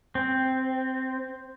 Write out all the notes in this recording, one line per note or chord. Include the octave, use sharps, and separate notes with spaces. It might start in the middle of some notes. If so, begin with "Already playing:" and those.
C4